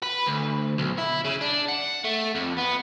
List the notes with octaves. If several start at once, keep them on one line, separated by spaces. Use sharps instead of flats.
B4
D2
B1
E4
C#3
D4
F#5
A3
F2
B3